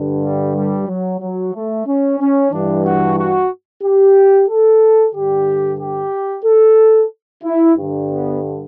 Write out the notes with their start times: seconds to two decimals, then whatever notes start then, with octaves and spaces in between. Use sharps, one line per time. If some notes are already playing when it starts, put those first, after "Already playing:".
Already playing: G2 D3
0.22 G3
0.54 G3
0.88 F#3
1.20 F#3
1.53 A3
1.86 C#4
2.19 C#4
2.51 G2 E3 D4
2.85 F#4
3.18 F#4
3.83 G4
4.49 A4
5.14 G2 D3 G4
5.79 G4
6.44 A4
7.44 E4
7.76 G2 D3
8.09 B3